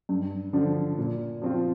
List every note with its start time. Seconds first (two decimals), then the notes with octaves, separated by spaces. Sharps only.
0.09 G2
0.53 D3 F3 D4 F4
0.98 A#2
1.42 F3 C4 F4